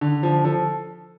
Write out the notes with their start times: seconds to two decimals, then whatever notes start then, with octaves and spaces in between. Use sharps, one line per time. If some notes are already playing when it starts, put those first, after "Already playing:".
0.01 D3
0.23 F3
0.44 F3 A4